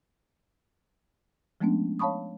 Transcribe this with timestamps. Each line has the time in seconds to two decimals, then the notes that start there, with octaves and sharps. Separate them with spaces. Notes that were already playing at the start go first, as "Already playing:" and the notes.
1.61 F3 G#3 A3 B3 C#4 D4
1.99 C#5 F5 A5 B5 C#6 D#6